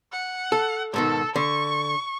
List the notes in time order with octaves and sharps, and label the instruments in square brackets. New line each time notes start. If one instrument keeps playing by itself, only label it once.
[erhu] F#5
[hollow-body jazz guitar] A4
[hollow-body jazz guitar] G#2 B2 D#3 [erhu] A4
[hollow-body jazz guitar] D3 [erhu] C#6